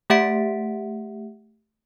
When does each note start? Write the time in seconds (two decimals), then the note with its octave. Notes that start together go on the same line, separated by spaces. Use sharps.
0.10 A3 G4 E5 F#5 B6 D7